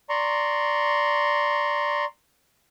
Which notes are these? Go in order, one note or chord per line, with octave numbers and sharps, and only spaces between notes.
D5 A#5 C6 C#6